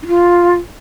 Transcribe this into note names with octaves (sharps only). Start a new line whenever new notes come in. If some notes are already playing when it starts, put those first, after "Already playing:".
D#4
F4